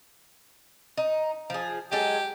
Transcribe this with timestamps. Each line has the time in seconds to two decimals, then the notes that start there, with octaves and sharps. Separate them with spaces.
0.97 D#4
1.50 F3 G#4
1.92 F#3 G#3 G4 A4